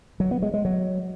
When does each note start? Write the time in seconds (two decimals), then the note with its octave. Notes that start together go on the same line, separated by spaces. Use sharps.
0.20 F#3
0.31 B3
0.42 G#3
0.54 G#3
0.65 F#3